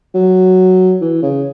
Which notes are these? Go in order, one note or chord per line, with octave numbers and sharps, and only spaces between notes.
F#3
E3
C#3